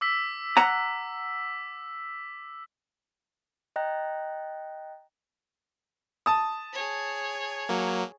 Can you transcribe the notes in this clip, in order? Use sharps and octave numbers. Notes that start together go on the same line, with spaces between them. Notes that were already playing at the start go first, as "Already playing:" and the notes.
D6 E6 B6
F#5 A#5
D#5 G5 A#5 F#6 A#6
A5 D#6
G#4 C#5
F#3 A#3